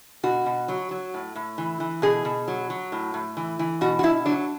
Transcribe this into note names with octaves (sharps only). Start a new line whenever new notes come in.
B2 F#4
B2
F#3
F#3
A2
A2
E3
E3
B2 G#4
B2
F#3
F#3
A2
A2
E3
E3
B2 F#4
F#4
B2 E4
F#3 D4